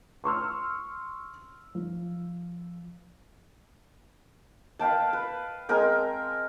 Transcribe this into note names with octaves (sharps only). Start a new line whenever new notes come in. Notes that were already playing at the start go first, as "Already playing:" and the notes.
C6 C#6 E6 F6
F3
B4 F5 G5 A5
B4
G#3 C4 A#4 G5